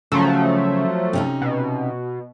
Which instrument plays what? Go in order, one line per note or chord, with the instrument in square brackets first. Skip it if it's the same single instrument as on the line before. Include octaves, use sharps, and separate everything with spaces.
[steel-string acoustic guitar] C#3 [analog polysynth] F3 F#3 A3
[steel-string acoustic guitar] C3 C#4 D#4
[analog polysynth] B2